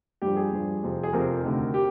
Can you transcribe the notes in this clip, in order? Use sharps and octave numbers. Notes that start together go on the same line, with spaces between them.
G2 F3 G4
G#4
G2 F3
F2 C3 F3
G#4
F2 C3 F3 A#4
D2 C3 D#3
G4